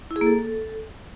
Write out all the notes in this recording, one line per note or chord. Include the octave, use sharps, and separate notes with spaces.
E4
G#4
A#3
A4